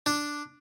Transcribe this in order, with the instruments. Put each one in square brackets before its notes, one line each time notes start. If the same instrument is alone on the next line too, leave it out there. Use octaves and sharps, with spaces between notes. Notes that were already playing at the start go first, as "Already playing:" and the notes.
[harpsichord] D4